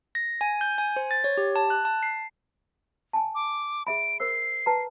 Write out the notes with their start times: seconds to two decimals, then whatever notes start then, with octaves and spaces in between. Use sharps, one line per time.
0.15 A#6
0.41 G#5
0.61 G6
0.78 G#5
0.96 C5
1.11 A6
1.24 C#5
1.37 G4
1.56 A5
1.70 F#6
1.85 A5
2.03 C7
3.13 G#5 A5
3.35 D6
3.87 G#4 E5 B5 D7
4.20 A#4 C5 E6 C7
4.66 B4 A5 A#5